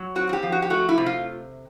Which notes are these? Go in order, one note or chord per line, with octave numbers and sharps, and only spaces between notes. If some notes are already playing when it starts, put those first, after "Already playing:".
Already playing: F#3
C4 F#4
F#4
G4
F3
F#4
G4
A3 F#4
E4
C3
F4